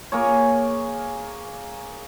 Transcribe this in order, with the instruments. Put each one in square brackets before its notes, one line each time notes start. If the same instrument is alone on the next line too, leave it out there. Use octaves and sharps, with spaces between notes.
[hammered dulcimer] A#3 G#4 C#5